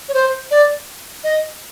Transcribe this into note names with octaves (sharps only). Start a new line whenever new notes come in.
C#5
C5
D5
D#5